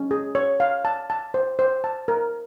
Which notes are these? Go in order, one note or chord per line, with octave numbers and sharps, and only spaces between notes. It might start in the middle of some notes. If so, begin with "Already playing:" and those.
Already playing: C#4
G#4
C#5
F5
A5
A5
C5
C5
A5
A#4